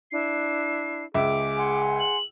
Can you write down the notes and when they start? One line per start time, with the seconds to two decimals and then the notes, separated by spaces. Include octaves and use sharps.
0.11 D4 E4 C7
1.15 C#2 G#4 E5 D6
1.57 F#5 G#5 C6
2.00 F#7